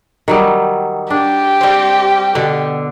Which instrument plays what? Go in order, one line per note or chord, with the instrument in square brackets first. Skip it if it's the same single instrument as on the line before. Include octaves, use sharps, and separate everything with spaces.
[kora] D#3 F#3 G3
[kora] D4 [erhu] G4
[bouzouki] G3 C4
[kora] B2 [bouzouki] D3